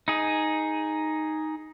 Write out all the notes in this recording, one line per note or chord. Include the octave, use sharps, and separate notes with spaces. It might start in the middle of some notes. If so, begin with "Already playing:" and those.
D#4 G#4